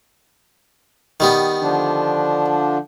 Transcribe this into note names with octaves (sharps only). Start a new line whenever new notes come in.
D#3 G3 B3
D3 F3 D4